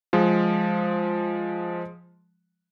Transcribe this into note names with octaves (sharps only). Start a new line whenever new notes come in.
F3 G#3